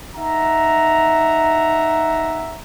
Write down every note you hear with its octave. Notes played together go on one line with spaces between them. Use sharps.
D#4 E5 F#5 A#5